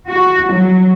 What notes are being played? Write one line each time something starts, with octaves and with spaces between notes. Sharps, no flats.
F#4
F#3